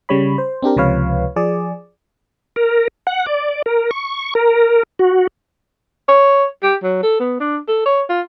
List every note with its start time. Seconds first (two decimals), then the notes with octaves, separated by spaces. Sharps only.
0.09 C#3 G3 C#5 B5
0.38 C5
0.62 C4 D4 G4 A#4
0.76 C#2 C3 F3 B4 C#5 F5
1.36 F3 G#4 D5
2.56 A#4
3.07 F#5
3.27 D5
3.66 A#4
3.91 C#6
4.35 A#4
4.99 F#4
6.08 C#5
6.63 G4
6.83 F#3
7.03 A4
7.20 B3
7.40 D4
7.68 A4
7.86 C#5
8.10 F4